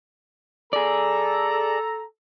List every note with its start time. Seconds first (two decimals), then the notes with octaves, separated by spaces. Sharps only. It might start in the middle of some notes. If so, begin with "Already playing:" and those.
0.73 G#4 A4 D5 A#5